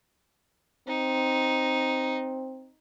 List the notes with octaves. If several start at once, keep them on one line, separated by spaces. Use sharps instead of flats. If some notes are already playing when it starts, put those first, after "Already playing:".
C4 D#4